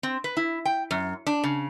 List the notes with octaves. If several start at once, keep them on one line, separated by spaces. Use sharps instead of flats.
C4
B4
E4
G5
F#2
D4
C#3